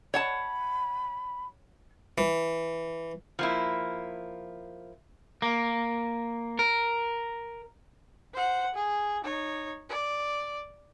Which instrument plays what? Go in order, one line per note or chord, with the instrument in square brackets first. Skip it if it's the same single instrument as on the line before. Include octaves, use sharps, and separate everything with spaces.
[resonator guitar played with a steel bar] C#5 F#5 A5 [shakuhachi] B5
[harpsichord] E3
[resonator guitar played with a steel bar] F3 A#3 E4
[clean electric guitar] A#3
A#4
[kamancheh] C5 F#5
G#4
D#4 C#5
D5